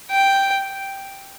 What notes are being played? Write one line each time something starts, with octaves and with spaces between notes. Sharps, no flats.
G5